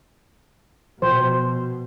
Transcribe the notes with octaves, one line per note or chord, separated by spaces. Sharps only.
B2 F3 C5